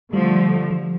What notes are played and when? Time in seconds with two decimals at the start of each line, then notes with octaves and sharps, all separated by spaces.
0.13 D3 F3 G3 A3
0.71 F3